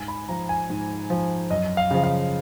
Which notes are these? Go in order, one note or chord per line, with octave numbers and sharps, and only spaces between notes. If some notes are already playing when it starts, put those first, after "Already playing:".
Already playing: G#2 G#5
B5
F3 A#5
G#5
G#2
F3
F#2 D#5
F5
C#3 F3
F5